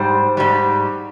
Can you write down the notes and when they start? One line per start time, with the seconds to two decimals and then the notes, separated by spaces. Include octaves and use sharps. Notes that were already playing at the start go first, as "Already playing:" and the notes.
Already playing: G#2 G3 C5
0.37 G#2 G3